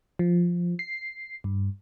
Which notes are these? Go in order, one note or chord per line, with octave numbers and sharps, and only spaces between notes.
F3
C7
G2